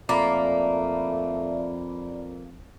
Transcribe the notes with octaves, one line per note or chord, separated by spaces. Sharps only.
F2 A3 A#3 D5 B5